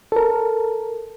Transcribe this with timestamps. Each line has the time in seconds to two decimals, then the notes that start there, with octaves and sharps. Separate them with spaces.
0.12 A4 A#4